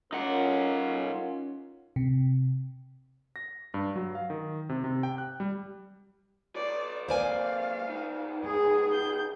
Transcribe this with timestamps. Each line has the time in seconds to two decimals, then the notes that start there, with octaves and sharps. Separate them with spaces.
0.13 C#4 D#4 F4 A#4 F#5
1.96 C3
3.36 A#6
3.74 G2
3.96 F#3
4.15 F5
4.30 D#3
4.69 C3
4.84 C3
5.03 G5
5.18 F#6
5.40 G3
6.56 B4 C#5 D5
7.09 G#3 A#3 C5 D5 F5 G#5
7.88 C#2 D#4
8.46 G#4
8.92 G6